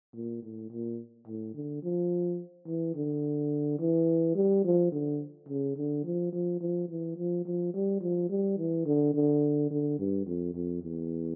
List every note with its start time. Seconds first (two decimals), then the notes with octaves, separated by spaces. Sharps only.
0.15 A#2
0.42 A2
0.70 A#2
1.27 A2
1.55 D3
1.83 F3
2.67 E3
2.95 D3
3.79 E3
4.35 G3
4.64 F3
4.92 D3
5.48 C#3
5.77 D3
6.04 F3
6.33 F3
6.61 F3
6.89 E3
7.17 F3
7.45 F3
7.74 G3
8.01 F3
8.30 G3
8.58 E3
8.85 D3
9.14 D3
9.70 D3
9.99 G2
10.26 F2
10.54 F2
10.83 E2